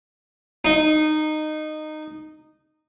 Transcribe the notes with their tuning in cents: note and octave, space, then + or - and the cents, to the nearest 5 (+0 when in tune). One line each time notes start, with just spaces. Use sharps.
D#4 -15